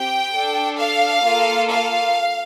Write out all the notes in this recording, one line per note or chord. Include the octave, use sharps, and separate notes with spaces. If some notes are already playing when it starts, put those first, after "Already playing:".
Already playing: C4 G4 G5
D4 A4
F5
A#3 F4 A4
F5